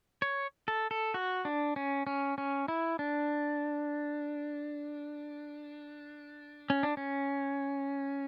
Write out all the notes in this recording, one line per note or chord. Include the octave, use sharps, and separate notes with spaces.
C#5
A4
A4
F#4
D4
C#4
C#4
C#4
E4
D4
C#4
D4
C#4